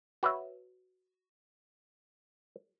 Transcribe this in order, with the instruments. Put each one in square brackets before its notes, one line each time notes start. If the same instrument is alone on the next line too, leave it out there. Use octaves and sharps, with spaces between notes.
[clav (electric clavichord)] F#4 B4 C#5 E5